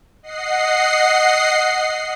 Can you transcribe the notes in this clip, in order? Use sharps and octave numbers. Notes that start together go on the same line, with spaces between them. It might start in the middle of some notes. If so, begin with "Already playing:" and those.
D#5 F#5 C7